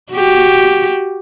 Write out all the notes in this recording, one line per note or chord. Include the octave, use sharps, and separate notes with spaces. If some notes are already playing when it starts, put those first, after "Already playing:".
F#4 G4